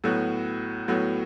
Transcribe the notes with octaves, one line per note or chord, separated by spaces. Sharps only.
A2 F#3 B3 F#4
A2 F#3 B3 F#4